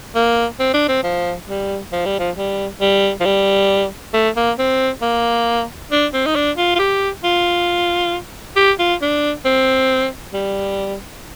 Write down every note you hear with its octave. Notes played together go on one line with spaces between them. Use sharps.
A#3
C4
D4
C4
F3
G3
F3
G3
F3
G3
G3
F3
G3
A3
A#3
C4
A#3
D4
C4
D#4
D4
F4
F4
G4
F4
G4
F4
D4
C4
G3